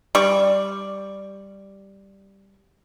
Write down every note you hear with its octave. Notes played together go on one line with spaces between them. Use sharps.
G3 D5 C#6